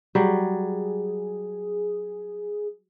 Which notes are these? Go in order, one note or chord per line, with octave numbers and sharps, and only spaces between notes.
F#3 G3 G#4